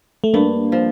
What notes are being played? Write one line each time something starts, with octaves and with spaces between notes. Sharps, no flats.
A3
G2 A#3
F3